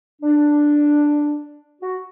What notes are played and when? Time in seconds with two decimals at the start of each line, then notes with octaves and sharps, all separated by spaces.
0.22 D4
1.82 F#4